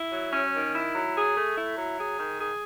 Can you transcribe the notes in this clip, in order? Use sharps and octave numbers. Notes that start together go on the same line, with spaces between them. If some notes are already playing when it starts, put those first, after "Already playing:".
Already playing: E4
F#3
C#4
D#3
E4
F#3
G#4
A3
E4
F#3
G#4
D#3
G#4